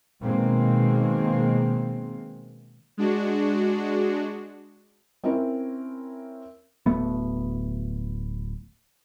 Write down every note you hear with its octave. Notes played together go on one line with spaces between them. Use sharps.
B2 D#3 G#3 A#3 C4
G#3 D4 F#4
C4 C#4 E4 A#4
D1 A3 B3